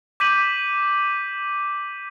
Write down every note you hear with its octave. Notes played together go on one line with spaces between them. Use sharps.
D6 G6 B6 D#7 F#7